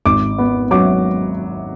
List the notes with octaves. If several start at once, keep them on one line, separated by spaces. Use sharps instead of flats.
G#1 D6
B3
F#3 D6